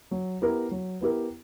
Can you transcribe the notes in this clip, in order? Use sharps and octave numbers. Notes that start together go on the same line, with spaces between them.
F#3
B3 E4 G4 A#4
F#3
B3 E4 G4 A#4